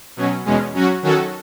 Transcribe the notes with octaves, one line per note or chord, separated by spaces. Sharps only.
B2 F#3 C#4
E2 B2 G#3 C#4
F#3 C#4 F#4
D#3 F#3 C#4 F#4 A4